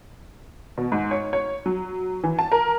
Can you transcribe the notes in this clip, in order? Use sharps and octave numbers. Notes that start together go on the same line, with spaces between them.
B2
G#2
C#5
C#5
F#3
E3
A5
A#4